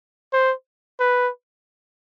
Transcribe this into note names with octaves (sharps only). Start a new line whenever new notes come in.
C5
B4